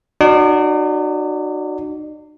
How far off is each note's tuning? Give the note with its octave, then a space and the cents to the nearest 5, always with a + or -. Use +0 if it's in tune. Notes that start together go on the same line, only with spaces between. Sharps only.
D#4 -45 F#4 +0 D5 -25